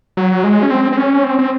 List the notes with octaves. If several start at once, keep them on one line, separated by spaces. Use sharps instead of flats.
F#3
G#3
C#4
C4
C4
C#4
C4
C4